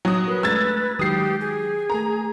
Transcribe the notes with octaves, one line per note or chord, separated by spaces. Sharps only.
F#3 D#4 C#6 D#6 A#6
F#4 A#4 B4
G#3 A3 D4 E6 G#6 A6
D#3 F#3 G#3 G4 D#6 C7
G#4
A3 A4 A#4 A#5